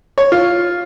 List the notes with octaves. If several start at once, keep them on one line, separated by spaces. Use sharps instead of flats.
C#5
F4